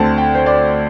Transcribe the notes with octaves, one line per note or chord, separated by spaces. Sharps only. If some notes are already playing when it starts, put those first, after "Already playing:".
Already playing: D2 D3 C4 A5
G5
C5
D5